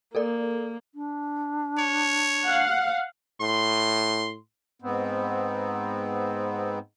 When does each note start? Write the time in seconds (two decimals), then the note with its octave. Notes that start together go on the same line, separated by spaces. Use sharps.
0.15 A#3 A4 A#4 D5
0.95 D4
1.78 C#5
2.45 F5 F#5
3.41 A2 C6
4.82 G#2 B3 C4